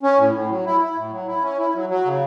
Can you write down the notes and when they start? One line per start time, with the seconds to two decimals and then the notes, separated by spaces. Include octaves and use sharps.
0.03 C#4
0.18 A2
0.34 A2
0.50 F#3
0.66 E4
0.81 E4
0.96 A2
1.12 F#3
1.28 E4
1.43 C#4
1.58 E4
1.74 F#3
1.89 F#3
2.05 C#3